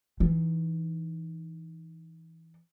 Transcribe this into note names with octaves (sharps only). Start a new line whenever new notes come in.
E3 D#4